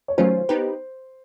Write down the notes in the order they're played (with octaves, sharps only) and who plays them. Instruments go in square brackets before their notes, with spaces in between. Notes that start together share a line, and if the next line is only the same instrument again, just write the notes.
[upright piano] C#5
[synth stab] D#3 F#3 A3 C#4 F4 [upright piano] C5
[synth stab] B3 D#4 G4 B4